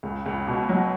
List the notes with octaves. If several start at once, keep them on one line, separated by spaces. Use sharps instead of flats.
C#2
C#2
B2
F#3